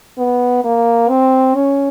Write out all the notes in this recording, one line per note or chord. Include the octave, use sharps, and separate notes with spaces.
B3
A#3
C4
C#4